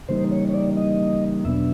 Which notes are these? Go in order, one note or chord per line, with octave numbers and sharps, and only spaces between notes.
C#3 E3 G3 A#3 D#4 C5
C#5
C#5
D5
D#5
E2 B2 F#3 B3 D4 E5